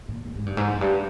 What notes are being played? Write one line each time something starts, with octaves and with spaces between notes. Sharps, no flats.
A#2
G#2
G#2
G2
G#2
F2
F#2
G2